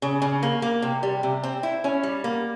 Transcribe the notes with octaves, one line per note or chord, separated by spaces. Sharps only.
C#3
C#3
A#3
A#3
C3
G3
C3
C4
E4
C#4
G3
A#3